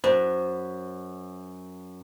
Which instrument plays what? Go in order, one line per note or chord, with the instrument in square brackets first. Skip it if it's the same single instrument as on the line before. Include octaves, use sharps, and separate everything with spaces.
[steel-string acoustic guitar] F#2 [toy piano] C5